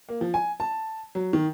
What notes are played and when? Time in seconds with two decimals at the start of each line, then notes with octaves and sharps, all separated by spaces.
0.09 A#3
0.21 F3
0.34 G#5
0.60 A5
1.15 F#3
1.33 D#3